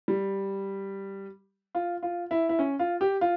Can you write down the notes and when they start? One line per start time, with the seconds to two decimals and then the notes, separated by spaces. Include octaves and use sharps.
0.08 G3
1.75 F4
2.03 F4
2.31 E4
2.49 E4
2.59 C#4
2.79 F4
3.01 G4
3.21 F4